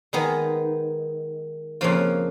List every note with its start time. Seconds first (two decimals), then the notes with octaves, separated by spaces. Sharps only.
0.13 D#3 G#3 B3 D#4
1.81 F2 C#3 F3 A#3 F4